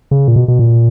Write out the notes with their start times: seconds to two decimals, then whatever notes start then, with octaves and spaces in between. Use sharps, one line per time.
0.11 C#3
0.28 A#2
0.36 B2
0.48 B2
0.59 A#2